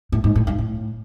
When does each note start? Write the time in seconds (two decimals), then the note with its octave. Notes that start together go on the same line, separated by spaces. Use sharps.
0.12 A2
0.24 G#2
0.35 A2
0.47 G2
0.58 A2